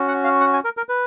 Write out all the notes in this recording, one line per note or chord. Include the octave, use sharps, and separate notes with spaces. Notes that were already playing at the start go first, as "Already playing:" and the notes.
Already playing: C#4 F#4
F#5
F5
F#5
G#5
A#4
A#4
B4